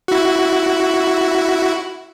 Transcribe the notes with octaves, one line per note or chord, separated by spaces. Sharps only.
E4 F#4